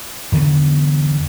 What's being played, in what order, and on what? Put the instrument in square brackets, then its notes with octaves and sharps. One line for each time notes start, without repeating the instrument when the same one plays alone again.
[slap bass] E2 D3 E3 B3